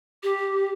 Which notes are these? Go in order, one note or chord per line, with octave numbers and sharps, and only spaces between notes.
G4